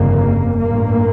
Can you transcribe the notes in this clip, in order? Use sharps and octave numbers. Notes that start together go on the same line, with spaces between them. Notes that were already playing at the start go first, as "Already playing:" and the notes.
Already playing: G1 F2 C#3 A#3
A1 G2 A#3